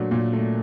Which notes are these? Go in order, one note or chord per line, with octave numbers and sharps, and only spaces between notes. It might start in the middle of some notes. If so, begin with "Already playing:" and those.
Already playing: A#2 F#3 A3 D4
A#2
A3